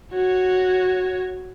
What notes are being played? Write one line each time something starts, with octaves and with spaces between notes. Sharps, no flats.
F#4 C#5